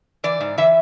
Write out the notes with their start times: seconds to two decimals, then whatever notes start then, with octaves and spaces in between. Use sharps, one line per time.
0.24 E3 D5
0.41 G#2
0.58 E3 E5